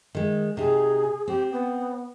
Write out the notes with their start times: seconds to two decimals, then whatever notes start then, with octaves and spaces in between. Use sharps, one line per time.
0.15 D#3 G#3
0.57 C3 D#4 G#4
1.27 C4 G4
1.52 B3